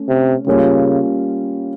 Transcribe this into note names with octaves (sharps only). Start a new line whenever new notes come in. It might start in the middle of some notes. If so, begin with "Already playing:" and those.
Already playing: A3 C#4
C3
C#3 G3 A#3 C#4 F4